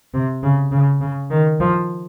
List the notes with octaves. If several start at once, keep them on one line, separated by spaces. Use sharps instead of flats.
C3
C#3
C#3
C#3
D#3
F3